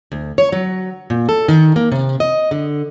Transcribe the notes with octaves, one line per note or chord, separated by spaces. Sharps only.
D2
C#5
F#3
A#2
A4
D#3
A#3
C3
D#5
D3